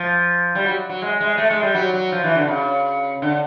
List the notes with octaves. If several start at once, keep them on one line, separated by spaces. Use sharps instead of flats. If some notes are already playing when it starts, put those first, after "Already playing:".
Already playing: F3
G3
F#3
F#3
G#3
G#3
A3
G#3
G3
F#3
F#3
F3
E3
D3
C#3
D3